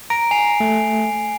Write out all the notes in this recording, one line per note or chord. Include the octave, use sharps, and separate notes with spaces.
A#5 D7
G#5 C7 F7
A3